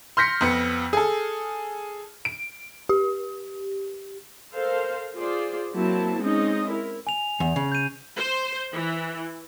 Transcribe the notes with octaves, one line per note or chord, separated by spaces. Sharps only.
C6 F6 G6 A#6 B6 C#7
F2 B3 C#7
G#4 A4
D7
G4
A4 A#4 C5 F5
F4 G#4 C5 D5
F#3 A#3 C4 E4 A5
G#3 C4 C#4 D#4 D#5
E4 A#4
G#5 F7
E2
C#3
G6 D#7
C5
E3